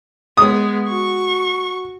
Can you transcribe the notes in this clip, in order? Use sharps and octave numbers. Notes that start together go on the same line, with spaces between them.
G#3 B3 D#6
F#4 C#6